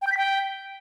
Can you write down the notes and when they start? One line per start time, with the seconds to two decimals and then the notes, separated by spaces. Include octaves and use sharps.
0.01 G5
0.07 G6
0.12 B6
0.17 G5